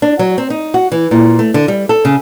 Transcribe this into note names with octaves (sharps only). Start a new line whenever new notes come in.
D4
F#3
C4
D#4
F#4
E3
A#2
A3
D3
G3
A4
C#3